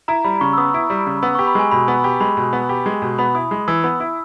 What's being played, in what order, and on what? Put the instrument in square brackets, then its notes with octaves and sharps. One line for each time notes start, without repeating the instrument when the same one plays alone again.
[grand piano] E4 [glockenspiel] A#5
[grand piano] G3 [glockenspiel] B5
[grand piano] C#3 [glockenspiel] C#6
[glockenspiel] E6
[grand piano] B3 [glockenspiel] D#6
[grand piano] E4
G3
C#3
[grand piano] B3 [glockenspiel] E6
[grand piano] G4 [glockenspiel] C#6
[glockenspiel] B5
[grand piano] G#3 [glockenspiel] G#5
[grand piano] B2 [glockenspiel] B5
[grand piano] B3
G4
[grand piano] G#3 [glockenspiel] B5
[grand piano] B2
B3
G4
G#3
B2
[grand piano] B3 [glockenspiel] B5
[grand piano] E4 [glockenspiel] D#6
[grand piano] G#3
[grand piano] E3 [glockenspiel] E6
[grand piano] B3
E4